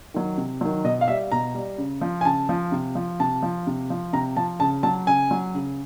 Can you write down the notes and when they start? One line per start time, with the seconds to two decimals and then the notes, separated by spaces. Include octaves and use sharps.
0.14 D#3 F#3
0.38 C3
0.61 D#3 F#3
0.84 B2 D#5
1.01 F5
1.08 G3 E5
1.32 B2 A#5
1.54 G3
1.78 C#3
2.01 F3
2.21 G#5
2.25 C#3 A5
2.49 F3
2.72 C3
2.95 F3
3.20 C3 A5
3.43 F3
3.67 C3
3.90 F3
4.13 C3 A#5
4.37 F3 A5
4.60 C#3 A5
4.83 F#3 A5
5.07 C#3 G#5
5.31 F#3
5.55 C#3